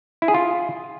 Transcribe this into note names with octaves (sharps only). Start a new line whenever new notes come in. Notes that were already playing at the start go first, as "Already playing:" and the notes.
E4
G#4
F4